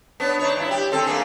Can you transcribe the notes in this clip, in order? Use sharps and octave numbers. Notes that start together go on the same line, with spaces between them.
B3 D4 C#5
D4 D#4 C#5
G2 E4
G4
D3 C4 A4
A3 A#3 G#4